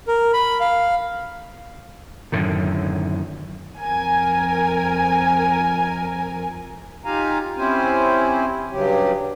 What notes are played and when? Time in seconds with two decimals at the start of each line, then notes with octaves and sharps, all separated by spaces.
0.08 A#4
0.34 B5
0.61 F5
2.32 F#2 A2 D3 D#3
3.79 F2 A#4 G#5
7.05 D#4 F4 G4 F5 G#5 A#5
7.57 C4 C#4 E4 G4 C5 G#5
8.71 G2 C#3 F#3 G4